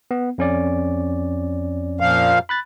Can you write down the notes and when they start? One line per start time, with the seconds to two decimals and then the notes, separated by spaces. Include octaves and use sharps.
0.11 B3
0.38 F2 C#4 D5
2.00 A#2 F3 F5
2.49 B5 F#6 A6